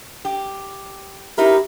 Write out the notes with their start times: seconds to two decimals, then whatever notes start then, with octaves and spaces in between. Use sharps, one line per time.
0.25 G4
1.38 D#4 E4 G4 A#4